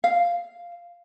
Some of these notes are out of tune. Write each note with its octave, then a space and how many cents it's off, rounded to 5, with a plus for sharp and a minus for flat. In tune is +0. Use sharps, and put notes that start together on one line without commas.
F5 -5